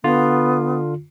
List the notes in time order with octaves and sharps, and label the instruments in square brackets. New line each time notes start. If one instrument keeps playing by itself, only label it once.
[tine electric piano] D3 F4 [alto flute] B3